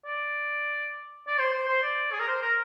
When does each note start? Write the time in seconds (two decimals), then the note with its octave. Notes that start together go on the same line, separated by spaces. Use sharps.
0.05 D5
1.28 D5
1.39 C5
1.53 C5
1.68 C5
1.83 D5
2.12 G#4
2.20 A#4
2.28 C5
2.42 A#4